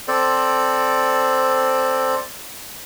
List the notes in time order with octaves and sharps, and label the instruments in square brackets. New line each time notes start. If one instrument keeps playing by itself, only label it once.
[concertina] C4 A4 C5 D5